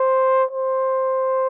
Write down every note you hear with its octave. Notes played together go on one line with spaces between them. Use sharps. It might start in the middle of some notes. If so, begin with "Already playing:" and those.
Already playing: C5
C5